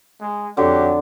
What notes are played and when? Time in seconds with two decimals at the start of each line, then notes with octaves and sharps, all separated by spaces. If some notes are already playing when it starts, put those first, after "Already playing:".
0.21 G#3
0.57 F2 D3 F#3 G4